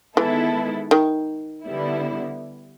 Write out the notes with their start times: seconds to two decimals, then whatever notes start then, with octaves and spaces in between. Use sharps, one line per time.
0.17 D#3 E3 G#3 B3 E4 A4
0.91 D#3
1.65 D3 G3 B3 E4